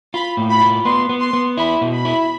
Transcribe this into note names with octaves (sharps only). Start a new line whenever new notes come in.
F4 B5
A2
B5
F4
B3 C6
B3
C6
B3
E4 B5
B2
B5
E4